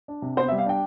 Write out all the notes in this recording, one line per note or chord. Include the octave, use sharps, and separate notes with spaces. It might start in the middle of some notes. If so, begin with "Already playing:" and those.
D4
C3
B3 C5
E5
G3
F5
D4 G5